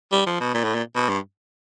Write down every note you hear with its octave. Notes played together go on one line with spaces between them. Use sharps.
G3
F3
B2
A#2
A2
A#2
B2
G2